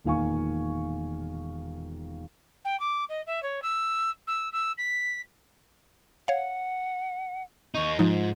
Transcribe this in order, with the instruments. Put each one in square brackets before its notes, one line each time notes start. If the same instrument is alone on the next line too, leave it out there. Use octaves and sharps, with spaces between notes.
[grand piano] E1 A#2 D#3 F5 G#5 C#6
[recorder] G5
D6
D#5
E5
C#5
E6
E6
E6
B6
[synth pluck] C#5 F5 [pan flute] F#5
[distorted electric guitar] D#2 D#4 [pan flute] C#6
[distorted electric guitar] G#2 [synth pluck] F3 D#4 [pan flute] F4